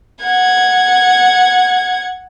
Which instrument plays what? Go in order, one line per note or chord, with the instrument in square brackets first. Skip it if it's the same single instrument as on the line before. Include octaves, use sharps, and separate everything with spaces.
[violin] F#5 G#6